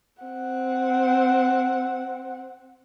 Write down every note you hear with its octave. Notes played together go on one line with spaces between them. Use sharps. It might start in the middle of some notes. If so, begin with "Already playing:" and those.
C4 F#5